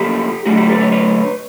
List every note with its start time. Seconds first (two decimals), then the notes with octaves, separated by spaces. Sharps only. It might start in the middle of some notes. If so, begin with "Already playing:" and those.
Already playing: C#3 F3 A#3 G4 A4
0.46 D3 F#3 A3 F#4 G#4
0.57 G4 A4
0.69 A4 B4
0.81 B4 C#5
0.92 B4 C#5